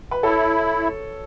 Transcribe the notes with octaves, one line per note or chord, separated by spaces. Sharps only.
B4
E4 A4 C#5